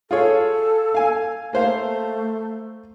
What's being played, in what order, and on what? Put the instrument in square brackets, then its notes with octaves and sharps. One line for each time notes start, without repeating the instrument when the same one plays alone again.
[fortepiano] F4 G#4 C#5 [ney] A4
[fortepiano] F5 G#5
[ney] A3 [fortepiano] A#3 C5 F5